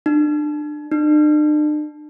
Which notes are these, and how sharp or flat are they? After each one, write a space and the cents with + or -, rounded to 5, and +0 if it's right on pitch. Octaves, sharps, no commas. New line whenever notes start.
D4 +30
D4 +45